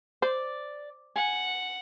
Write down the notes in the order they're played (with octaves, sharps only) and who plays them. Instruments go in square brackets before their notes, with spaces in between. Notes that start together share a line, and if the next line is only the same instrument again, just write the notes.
[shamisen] C5 [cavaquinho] D5
[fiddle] F#5 [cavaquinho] G#5